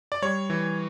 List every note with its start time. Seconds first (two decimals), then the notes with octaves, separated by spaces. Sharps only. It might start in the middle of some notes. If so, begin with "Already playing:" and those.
0.12 D5
0.22 G3 C#5
0.50 E3